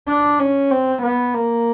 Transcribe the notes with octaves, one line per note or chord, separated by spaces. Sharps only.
D4
C#4
C4
B3
A#3